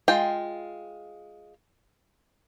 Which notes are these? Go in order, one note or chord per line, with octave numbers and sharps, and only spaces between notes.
G#3 F4 G5